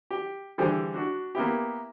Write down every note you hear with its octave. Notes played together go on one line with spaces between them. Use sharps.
G4
D3 E3 G3 G#4 C5
D4 F#4
A#3 B3 E4 G4